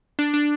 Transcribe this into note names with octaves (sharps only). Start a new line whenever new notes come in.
D4
D4